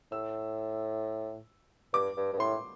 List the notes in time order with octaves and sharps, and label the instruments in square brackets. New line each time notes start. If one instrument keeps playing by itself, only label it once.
[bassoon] A2 [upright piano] E6
[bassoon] G2 [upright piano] D6
[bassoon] G2
G2
[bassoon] A2 [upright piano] C6